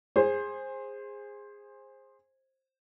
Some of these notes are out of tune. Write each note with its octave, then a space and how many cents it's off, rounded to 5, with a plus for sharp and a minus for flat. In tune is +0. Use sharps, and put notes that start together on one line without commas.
G#4 -15 C5 +15